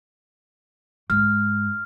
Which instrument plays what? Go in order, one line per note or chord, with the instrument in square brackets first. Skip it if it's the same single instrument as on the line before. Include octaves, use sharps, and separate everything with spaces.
[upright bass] G#2 [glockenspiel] F6